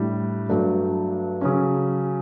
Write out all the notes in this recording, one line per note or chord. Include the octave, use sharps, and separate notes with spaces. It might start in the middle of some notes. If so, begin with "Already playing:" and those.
Already playing: A2 G3 D4
G2 F#3 A3 D4
C#3 F#3 C#4